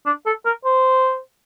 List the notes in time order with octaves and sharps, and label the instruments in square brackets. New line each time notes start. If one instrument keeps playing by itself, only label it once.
[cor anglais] D4
A4
A#4
C5